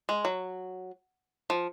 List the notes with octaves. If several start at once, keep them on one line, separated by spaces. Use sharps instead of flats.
G#3
F#3
F3